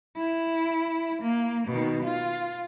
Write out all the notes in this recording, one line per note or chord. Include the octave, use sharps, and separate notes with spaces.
E4
A#3
B2 D#3
F4